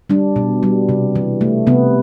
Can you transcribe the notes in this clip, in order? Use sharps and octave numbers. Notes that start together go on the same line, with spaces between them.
G3 D4
B2
G3
C3
E3
A3
C3 B3